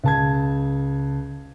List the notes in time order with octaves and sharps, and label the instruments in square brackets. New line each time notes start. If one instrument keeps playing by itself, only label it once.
[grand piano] C#2 A5 G#6